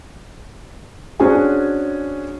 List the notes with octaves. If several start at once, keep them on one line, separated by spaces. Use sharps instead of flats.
C#4 D4 F#4 G#4 C5 G#5